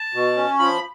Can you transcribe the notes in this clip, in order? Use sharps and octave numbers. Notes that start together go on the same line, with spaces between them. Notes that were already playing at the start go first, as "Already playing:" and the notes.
Already playing: A5
B2
C#4
F3 B5